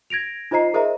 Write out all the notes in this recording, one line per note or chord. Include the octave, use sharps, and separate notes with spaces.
G#6 A#6 D7 F7
D#4 F4 C5 D#5 A#5 C7
G#4 A#4 C5 D#5 E5 A#5